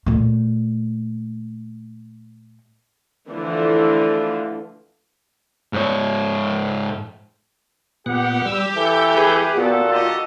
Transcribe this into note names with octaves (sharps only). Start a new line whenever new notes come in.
A#2 A3
D3 E3 F3 A3 D4 F4
G#2 C#5
A#2 B3 G4 F#5
G3 E6
E3 A4 G6
G#4 B4
A#2 B3 F#4 A4
D#4 F4 G4 D#5